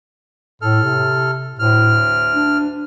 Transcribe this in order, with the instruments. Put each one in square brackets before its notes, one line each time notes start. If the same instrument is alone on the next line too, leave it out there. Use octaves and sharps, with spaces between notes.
[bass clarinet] A2 [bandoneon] A4 F6
[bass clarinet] C3
[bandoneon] D2 F6 [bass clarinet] A2
[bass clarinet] D4